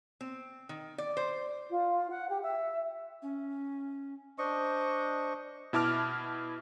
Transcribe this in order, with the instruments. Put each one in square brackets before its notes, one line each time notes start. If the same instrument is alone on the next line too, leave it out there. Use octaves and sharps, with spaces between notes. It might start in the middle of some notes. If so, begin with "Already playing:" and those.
[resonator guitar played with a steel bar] C4
D#3
D5
C5
[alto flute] F4
F#5
G4
E5
[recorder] C#4
[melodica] D4 D#5 C#6 [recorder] C5
[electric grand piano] B2 E4 A5 D6 F6